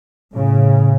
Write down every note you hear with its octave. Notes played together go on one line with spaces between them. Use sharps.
A2 C#3